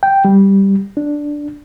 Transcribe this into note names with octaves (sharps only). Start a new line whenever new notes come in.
G5
G3
D4